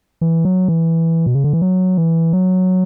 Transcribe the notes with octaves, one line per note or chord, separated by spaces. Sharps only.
E3
F#3
E3
B2
C#3
D3
E3
F#3
E3
F#3